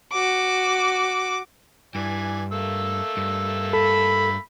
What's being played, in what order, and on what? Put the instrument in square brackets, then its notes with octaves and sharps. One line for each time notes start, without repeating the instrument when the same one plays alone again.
[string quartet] F#4 D6
[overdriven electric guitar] G2 [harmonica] E3 D5 G#5
[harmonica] A3 A#3 E6
[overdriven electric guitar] G2
[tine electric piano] A4 [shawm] B5